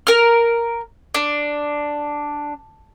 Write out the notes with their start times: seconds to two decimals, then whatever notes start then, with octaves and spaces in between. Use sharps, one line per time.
0.07 A#4 F6
1.14 D4